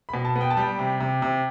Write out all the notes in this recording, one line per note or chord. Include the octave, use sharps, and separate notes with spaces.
B5
B2
A5
B3
G5
A5
G3 G5
C3
C3
C3